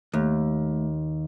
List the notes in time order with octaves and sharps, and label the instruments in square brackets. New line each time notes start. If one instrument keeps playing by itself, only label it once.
[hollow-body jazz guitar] D#2 [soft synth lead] A3